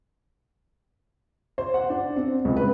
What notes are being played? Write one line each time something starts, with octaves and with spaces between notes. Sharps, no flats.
C5
F#5
D4
C4
C#2
B4